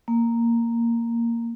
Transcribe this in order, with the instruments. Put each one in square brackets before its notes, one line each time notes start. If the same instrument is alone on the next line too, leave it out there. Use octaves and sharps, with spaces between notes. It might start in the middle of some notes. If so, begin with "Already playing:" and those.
[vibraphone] A#3